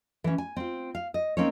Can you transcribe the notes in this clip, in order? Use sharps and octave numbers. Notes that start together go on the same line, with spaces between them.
E3 C#4
G#5
C4 F4
F5
D#5
A#3 C4 C#4 D#4 C#5